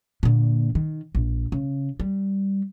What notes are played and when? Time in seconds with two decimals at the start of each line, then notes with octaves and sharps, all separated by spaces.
0.23 A#2 D3
0.75 D#3
1.15 A#1
1.52 C#3
2.00 G3